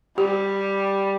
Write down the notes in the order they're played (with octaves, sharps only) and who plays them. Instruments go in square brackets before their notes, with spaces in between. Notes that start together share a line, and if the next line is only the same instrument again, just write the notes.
[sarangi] G3 [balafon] G4